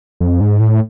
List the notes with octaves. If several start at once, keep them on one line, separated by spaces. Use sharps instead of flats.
F2
G#2
A2